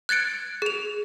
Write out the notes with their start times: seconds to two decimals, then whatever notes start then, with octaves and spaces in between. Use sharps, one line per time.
0.09 F#6 G#6 A6 C#7 D7
0.62 G#4 F7